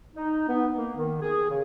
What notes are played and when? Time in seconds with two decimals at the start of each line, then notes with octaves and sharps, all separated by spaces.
0.16 D#4
0.48 B3
0.76 A#3
0.96 D#3
1.21 G#4
1.49 C#3